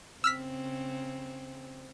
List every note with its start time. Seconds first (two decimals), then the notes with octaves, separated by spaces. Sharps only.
0.24 C#3 C4 E6 F6 B6